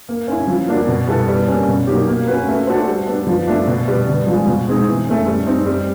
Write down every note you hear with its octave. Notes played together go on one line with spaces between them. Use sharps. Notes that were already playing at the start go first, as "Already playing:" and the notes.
A#3
C#4 E4
F3
A#3 D4 F#4
B2
G3 B3 E4 A4
G3
A#3 C#4
B2
F#3 A#3 D#4 G4
A#3
C#4 F#4 B4
A3
D4 F#4 A4 C5
G3
B3 D4
F3
A3 D4
B2
G3 B3
D3
F3 G#3
B2
G#3 C4 D#4 G#4
E3
A3 C#4
G3
C4 D#4
G3